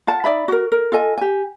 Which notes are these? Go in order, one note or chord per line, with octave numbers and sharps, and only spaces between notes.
F4 F#5 A5
D#4 D5 E5 B5
F#4 A#4
A#4
F4 A4 D#5 G#5
G4 G#5